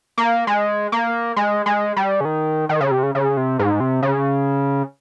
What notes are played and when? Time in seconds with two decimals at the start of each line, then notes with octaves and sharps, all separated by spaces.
0.18 A#3
0.47 G#3
0.92 A#3
1.36 G#3
1.66 G#3
1.96 G3
2.21 C#3
2.25 D#3
2.69 D#3
2.81 C#3
2.91 C3
3.03 C#3
3.15 C#3
3.37 C3
3.59 G#2
3.80 C3
4.03 C#3